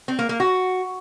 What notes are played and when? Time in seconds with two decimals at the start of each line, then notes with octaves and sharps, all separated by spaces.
0.08 C4
0.19 A#3
0.29 A#3
0.40 F#4